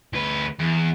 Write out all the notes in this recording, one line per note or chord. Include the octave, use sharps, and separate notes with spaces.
D2 B4
E2